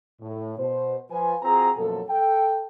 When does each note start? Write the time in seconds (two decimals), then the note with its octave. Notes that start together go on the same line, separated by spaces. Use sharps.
0.21 A2
0.58 B2 C5
1.11 F3 F4 B4 G#5
1.43 C4 F4 F#4 G#4 A#5
1.76 F#2 B2 F3 F#3 A#3 A4
2.08 A4 G5